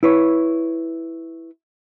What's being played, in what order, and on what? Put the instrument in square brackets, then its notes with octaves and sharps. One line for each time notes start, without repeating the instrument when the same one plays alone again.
[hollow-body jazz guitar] E4 B4 C#5